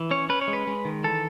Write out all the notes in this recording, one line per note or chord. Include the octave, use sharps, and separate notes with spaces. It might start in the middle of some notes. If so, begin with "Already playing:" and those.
Already playing: E3
C#4 C#5
C#4 B4
C#5
G#3
B4
G#3
D#3
E3 A4